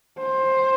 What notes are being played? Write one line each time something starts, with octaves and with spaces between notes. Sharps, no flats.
C5